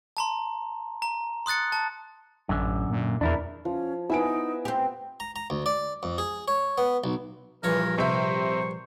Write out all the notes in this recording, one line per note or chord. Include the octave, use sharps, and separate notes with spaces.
A5 A#5 C6
A#5
C6 D#6 F#6 A6 C#7
A5
A1 F#2 D3
A#2
E2 D4 E4 A#4
F3 C#4
B3 D#4 E4 G#5 E6 D7
C4 G4 B4
A#5
A#5
D2
D5
F2
G#4
C#5
B3
B1
A#1 G2 E3 A#4 C#5
C3 C5 E5 C#6